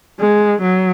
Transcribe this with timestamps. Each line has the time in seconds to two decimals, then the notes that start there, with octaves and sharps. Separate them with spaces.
0.19 G#3
0.62 F#3